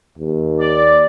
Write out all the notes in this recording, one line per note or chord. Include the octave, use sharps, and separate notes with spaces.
D#2
D5